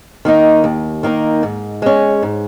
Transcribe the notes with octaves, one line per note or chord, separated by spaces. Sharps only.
D#3 A#3 D#4
D#2
D#3 A#3 D#4
G#2
G#3 C#4
G#2